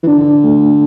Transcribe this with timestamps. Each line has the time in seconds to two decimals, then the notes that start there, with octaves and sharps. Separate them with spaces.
0.03 E3
0.07 D3 D4
0.44 A3